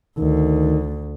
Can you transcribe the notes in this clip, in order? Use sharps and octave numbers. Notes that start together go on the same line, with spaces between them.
D2 D#3